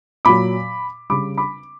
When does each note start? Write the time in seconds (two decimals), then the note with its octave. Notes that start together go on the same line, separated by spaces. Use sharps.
0.25 A#2 F#3 B5 D6
1.10 C#3 G3 B5 D6
1.37 B5 D6